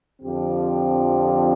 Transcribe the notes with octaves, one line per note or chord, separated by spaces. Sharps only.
F2 D3 F3 C4 G4